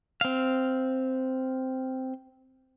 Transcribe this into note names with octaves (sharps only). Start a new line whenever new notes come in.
C4 F5